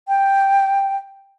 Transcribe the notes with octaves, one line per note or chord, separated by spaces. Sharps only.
G5